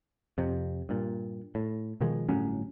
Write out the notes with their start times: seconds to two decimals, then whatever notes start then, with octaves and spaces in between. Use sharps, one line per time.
0.38 F2 C3
0.89 G2 A#2
1.55 A2
2.01 B2 D#3 F3 G#3
2.29 G1 A2 F#3 C#4